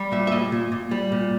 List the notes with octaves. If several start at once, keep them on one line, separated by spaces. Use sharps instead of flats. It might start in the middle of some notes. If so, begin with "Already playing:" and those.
Already playing: G3
A#2 E5
E5
A#2 D#5
A#2
A#2
G3
A#2